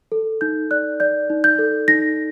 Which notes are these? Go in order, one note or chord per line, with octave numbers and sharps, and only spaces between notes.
A4
D#4 G6
D5 F#6
D5 G6
D#4
G6
A4
D#4 A#6